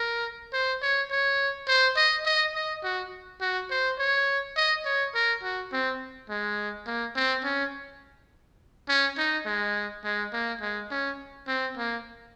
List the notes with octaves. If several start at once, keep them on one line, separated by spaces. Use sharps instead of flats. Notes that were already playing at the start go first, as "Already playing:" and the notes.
Already playing: A#4
C5
C#5
C#5
C5
D#5
D#5
D#5
F#4
F#4
C5
C#5
D#5
C#5
A#4
F#4
C4
G#3
A#3
C4
C#4
C#4
D#4
G#3
G#3
A#3
G#3
C#4
C4
A#3